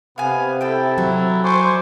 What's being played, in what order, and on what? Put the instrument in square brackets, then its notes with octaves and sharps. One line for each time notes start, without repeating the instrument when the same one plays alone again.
[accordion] C3 [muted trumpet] B3 [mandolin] F5 G#5
[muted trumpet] E4 [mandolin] A4 G5
[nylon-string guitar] F#3
[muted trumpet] C5 [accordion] G#5 C#6 D6